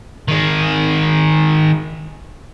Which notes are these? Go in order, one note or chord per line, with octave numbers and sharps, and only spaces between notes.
D#3 G#4